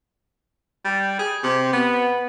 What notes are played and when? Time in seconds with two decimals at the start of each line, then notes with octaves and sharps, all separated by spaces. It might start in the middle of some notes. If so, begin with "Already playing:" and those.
0.84 G3
1.19 G#4
1.43 C3
1.73 B3